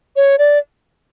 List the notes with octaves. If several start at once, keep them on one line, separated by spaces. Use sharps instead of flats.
C#5
D5